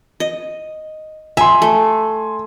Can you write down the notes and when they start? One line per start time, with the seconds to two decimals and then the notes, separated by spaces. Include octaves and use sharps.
0.20 D#5
1.37 E5 G#5 C6
1.62 A3